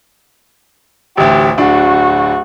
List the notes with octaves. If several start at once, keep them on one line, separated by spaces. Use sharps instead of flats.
A1 D2 G4
D1 D4 F#4